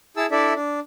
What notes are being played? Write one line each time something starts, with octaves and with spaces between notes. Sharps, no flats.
E4 G#4 A5 E6
D4 E4 A4 D5 E5
D4